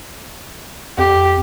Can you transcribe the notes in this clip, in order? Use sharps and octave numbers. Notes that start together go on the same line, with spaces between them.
F2 G4